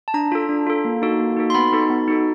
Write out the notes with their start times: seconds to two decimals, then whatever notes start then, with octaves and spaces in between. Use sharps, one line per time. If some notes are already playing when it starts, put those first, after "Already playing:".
0.08 A5
0.14 D4 A#5
0.32 F4 A4
0.49 D4
0.67 F4 A4
0.85 A#3
1.02 D#4 F#4 A4
1.20 A#3
1.36 D#4 F#4 A4
1.50 C6
1.55 B3 B5
1.73 D#4 F#4 A4
1.90 B3
2.08 D#4 F#4 A4